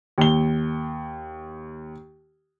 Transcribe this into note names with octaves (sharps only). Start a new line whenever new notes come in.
D#2 G7